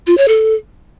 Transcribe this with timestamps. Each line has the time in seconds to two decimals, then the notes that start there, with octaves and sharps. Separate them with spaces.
0.07 F4
0.17 C#5
0.28 A4